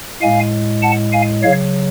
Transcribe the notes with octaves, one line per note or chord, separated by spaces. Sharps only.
A2 G#3 F5 G#5
F#5 A5
F5 G#5
C#3 F#3 C#5 F5